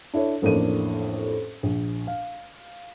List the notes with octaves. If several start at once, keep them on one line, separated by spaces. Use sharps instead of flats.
D4 E4 A4 C#5
A1 F2 A2 A#3 D4 D#7
A#1
F5